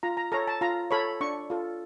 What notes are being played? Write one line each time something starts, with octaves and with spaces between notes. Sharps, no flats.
F4 A#5
A#5
A4 C#5 A#5
A5
F4 A#5
A4 C#5 B5
D4 C#6
F4 A4